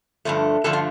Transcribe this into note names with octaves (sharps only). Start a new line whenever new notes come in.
G2 D3 F3 A3
G2 D3 F3 A3 A4
F4